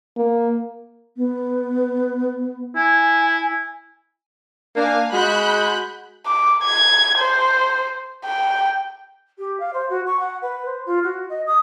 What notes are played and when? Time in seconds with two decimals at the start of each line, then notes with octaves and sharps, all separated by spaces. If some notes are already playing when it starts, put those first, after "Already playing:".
0.17 A#3
1.17 B3
2.76 E4 G#5
4.76 A#3 D4 F5 G#5
5.13 G#3 F#4 B5 F#6 G6
6.26 D6
6.64 G#6
7.19 C5
8.25 G5
9.38 G4
9.59 F5
9.73 C5
9.89 F#4
10.06 C#6
10.19 F#5
10.42 B4
10.65 C5
10.86 F4
11.03 F#4
11.29 D#5
11.46 D#6